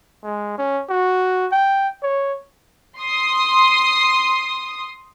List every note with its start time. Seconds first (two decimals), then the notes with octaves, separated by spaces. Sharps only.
0.24 G#3
0.58 C#4
0.89 F#4
1.52 G5
2.03 C#5
3.00 C6 D#6